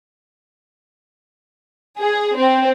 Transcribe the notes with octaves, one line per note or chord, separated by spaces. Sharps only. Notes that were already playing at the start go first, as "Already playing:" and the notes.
G#4
C4